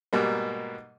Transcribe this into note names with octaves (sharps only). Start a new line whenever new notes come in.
G#2 B2 G3 A#3